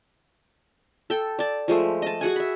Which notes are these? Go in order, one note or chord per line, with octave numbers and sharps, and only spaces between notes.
A4 G5
D5 A5
F3 G#3 A3
D#5 A5
F#4 G#4 F#5 G#5
E5 B5